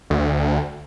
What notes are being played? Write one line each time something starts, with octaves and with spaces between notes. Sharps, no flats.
D2